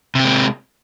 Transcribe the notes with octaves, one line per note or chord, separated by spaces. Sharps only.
C3 G#3 C4